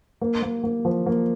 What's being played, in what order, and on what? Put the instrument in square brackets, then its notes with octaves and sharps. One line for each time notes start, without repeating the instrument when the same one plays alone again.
[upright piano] A#3
A#3
A#3
F3
A#3